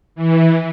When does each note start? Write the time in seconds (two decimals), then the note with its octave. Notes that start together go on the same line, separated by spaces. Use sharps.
0.15 E3